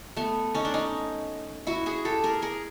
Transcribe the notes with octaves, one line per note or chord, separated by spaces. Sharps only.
A3 B3
C#4 D#4
D4
C#4 D#4
E4 F#4
F#4 G#4
G4 A4
G#4 A#4
G#4 A#4